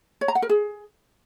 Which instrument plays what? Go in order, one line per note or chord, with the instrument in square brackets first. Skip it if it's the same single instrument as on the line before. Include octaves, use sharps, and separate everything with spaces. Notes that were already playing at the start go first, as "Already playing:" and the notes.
[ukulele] C#5
A#5
F#5
A#4
G#4